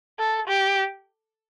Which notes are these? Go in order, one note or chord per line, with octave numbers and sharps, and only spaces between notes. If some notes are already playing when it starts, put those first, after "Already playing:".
A4
G4